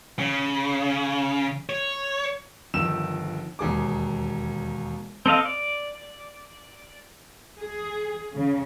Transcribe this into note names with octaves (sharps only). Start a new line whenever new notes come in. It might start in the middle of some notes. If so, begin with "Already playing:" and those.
C#3
C#5
G1 D#3 F3 E6 E7
E1 D#2 G#4 D6
C4 A4 D#5 F5
D5
G#4
C#3